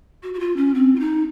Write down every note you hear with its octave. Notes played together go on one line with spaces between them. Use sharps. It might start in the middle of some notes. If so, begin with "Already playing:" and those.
F#4
F#4
F4
C#4
C4
F4
D#4